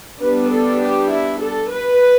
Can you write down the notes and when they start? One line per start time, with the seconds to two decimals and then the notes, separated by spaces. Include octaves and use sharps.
0.21 G3 B3 D4 B4
0.51 A4
0.81 G4
1.12 E4
1.42 A4
1.72 B4